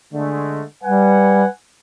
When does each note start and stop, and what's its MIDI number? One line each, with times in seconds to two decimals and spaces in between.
0.13 0.63 50
0.13 0.63 56
0.13 0.63 57
0.84 1.45 55
0.84 1.47 71
0.84 1.47 78
0.84 1.47 80